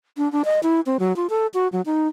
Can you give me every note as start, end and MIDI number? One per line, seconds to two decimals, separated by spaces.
0.18 0.31 62
0.32 0.43 62
0.45 0.60 75
0.63 0.80 64
0.86 0.97 60
1.00 1.15 54
1.16 1.27 65
1.30 1.47 69
1.54 1.68 66
1.72 1.81 54
1.86 2.08 63